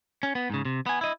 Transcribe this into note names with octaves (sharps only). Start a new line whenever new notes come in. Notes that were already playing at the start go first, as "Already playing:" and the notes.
C#4
B3
G#2 C#3
C3
B3 G#5
E4 D#5